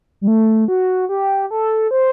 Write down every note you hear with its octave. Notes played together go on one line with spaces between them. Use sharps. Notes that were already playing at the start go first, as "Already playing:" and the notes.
G3
A3
F#4
G4
A4
C5